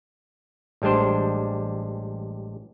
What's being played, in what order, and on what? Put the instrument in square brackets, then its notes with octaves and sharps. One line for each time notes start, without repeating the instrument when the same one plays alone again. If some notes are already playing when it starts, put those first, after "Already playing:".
[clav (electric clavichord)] A1 G3 G#3 D4 C5